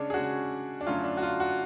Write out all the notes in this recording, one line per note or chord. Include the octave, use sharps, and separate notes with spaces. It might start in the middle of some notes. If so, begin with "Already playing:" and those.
Already playing: C#3 G#3 C#4 D4
G#4
C#3 G#3 C#4 F#4
D4
F#2 D3 F#3 A3 C#4 F4
D4
F#4
F4
F#4